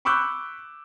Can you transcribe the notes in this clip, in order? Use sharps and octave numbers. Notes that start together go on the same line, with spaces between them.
B5 C#6 D6 E6 F#6 G6